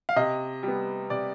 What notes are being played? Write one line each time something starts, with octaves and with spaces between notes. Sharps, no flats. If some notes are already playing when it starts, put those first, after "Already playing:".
F5
C3 D#5
G3
B3
C3 D5